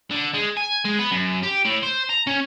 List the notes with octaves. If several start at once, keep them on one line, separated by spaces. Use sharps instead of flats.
D3
G#3
G#5
G#3
B3
F#2
G4
A2
C5
A#5
C#4